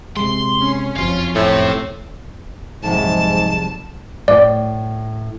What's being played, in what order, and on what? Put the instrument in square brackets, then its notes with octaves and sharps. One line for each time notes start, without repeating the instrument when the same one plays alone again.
[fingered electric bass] C3 G#3 [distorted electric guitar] C6
[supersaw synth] C#4
[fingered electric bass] F#1 F2 F3 [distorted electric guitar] F5 C6
[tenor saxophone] A2 [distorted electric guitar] C3 C4
[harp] F1 C2 F#3 [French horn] G#2 [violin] A5
[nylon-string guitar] A2 [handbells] D5